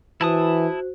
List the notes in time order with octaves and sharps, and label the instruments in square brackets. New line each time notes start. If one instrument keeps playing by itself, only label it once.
[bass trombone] E3 [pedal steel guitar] E4 A5 D#6 [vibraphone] F#4 C5